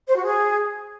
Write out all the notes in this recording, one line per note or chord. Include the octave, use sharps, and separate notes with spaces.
C5
F#4
G#4